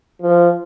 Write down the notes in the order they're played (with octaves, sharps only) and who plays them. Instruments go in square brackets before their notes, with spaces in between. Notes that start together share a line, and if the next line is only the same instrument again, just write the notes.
[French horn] F3